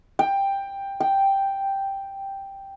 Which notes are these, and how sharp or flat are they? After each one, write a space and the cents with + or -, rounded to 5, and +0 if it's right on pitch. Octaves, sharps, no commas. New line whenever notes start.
G5 +10
G5 +0